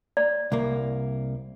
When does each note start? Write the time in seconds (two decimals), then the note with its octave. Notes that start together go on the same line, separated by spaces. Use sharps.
0.17 D5
0.52 C2 A#3